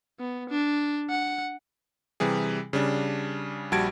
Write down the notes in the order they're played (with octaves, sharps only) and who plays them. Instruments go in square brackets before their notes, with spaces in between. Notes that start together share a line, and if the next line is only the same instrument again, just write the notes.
[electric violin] B3
D4
F#5
[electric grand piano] C3 E3 G3 G#4
C#3 G3 D4
A#1 G3 F#4 A5 G#6 D7